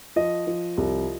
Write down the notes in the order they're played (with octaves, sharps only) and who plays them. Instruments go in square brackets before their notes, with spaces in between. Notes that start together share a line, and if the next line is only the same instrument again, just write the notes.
[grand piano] F3 D#5
F3
C2